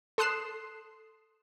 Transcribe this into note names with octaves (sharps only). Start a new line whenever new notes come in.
A4 C6 D#6 F#6 C7 E7